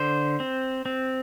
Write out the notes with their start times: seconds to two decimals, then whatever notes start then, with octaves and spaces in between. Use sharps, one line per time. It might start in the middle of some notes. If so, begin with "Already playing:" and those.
Already playing: D3 C5
0.40 C4
0.86 C4